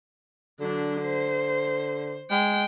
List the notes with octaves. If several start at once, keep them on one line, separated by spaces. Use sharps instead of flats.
D3 F#3 D4
C5
G#3 G5